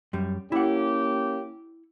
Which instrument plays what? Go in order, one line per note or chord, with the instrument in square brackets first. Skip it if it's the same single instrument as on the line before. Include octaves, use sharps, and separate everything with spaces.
[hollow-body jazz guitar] F#2 G3
[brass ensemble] A#3 C#4 G4 [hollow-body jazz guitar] E4 F#5